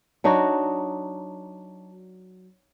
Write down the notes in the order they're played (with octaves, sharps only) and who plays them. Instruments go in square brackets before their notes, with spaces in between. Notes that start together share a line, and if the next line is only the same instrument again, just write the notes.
[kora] F#3 D4 D#4 F#4